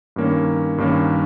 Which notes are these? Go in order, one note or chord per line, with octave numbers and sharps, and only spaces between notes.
G2 D#3 A#3 C#4
G2 D#3 A#3 C#4